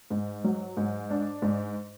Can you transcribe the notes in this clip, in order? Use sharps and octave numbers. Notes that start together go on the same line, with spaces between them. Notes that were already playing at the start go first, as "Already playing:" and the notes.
G#2
F#3
G#2
D4
G#2